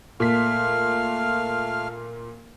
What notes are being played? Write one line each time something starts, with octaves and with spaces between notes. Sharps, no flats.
A#2 A3 F5 F6 B6